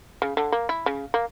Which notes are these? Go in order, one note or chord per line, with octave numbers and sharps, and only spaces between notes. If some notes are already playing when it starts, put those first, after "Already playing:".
C#3
D3
A#3
E4
C#3
A#3